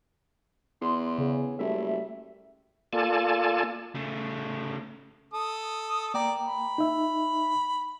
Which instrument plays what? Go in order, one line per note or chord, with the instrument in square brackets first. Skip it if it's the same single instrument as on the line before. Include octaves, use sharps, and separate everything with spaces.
[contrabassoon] E2 [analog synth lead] C6
[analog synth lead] C#3 [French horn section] B3 C#4 G#4
[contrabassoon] F#1 [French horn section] G3 A3 [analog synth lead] E5
[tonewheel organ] A#3 F4 A4 D5 G#5 A5
[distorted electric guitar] C#3 A3
[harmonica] A4 D#6
[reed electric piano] A#3 G5 A#5 [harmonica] D5
[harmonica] B5
[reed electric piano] D#4 E5